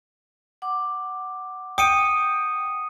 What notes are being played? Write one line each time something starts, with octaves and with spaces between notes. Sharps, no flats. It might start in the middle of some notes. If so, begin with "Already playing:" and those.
F#5 D6
G5 D#6 C#7 D#7